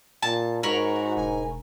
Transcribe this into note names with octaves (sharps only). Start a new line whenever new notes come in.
A#2 A5
G#2 F#4 A#4 C#5 B5
E1 G#5